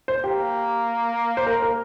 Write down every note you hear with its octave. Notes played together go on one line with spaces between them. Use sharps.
C5
A#3 G4
C5
A#4
A#4